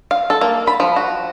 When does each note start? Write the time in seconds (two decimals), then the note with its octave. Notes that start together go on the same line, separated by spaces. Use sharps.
0.11 F5
0.30 A4
0.41 A#3
0.67 B5
0.80 F3
0.96 F#4